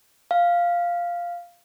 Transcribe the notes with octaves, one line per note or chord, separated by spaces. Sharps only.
F5